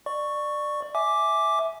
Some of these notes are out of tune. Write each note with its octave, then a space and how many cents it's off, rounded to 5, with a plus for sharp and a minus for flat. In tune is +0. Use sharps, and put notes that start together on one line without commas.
D5 +20 C#6 +0
E5 -10 G#5 +15 D6 +0